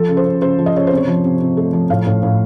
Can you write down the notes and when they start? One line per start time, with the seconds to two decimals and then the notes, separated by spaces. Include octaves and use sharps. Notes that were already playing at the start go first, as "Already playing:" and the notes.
Already playing: F3 A4
0.09 C#3
0.17 C5
0.25 C#3
0.42 C#3 C5
0.58 F3
0.66 D#5
0.75 C#3 C#5
0.87 C3 C5
0.97 C#5
1.07 F3
1.24 C3
1.40 C3
1.57 A3
1.73 F3
1.90 A2 F5
2.07 A2
2.23 A2